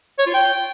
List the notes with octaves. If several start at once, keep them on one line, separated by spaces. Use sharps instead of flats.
C#5
F4
G5